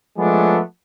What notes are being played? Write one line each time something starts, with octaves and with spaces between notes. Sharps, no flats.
F3 G#3 A3 B3 D4